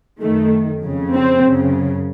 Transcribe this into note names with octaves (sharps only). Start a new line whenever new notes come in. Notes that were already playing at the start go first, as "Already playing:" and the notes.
F#2 D#3 A3
F2 C#3
C4
F#2 C#3